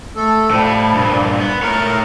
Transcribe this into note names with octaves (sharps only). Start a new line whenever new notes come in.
A3 A4
A2 F3 G3
G2 A#2
B3
A3 A#4 C#5